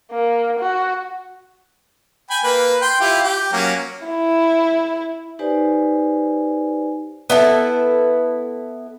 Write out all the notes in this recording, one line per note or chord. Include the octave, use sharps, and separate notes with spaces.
A#3
F#4
G5 G#5 B5
A#3 B4
G5 C6
E4 F4 G4
G4
F#3 A#3 C#4
E4
D#4 G4 B4 C5 D5 G#5
B3 E4 A4